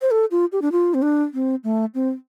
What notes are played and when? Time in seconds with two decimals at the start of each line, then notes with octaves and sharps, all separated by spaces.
0.02 C5
0.11 A4
0.31 F4
0.52 G4
0.62 D4
0.72 F4
0.94 C4
1.02 D4
1.34 C4
1.64 A3
1.94 C4